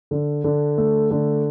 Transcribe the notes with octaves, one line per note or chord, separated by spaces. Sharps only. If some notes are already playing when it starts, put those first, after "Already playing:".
D3
D3
A3
D3